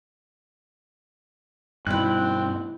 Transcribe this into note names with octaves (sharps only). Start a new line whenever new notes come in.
G2 B2 C4 D#4 E4 F#6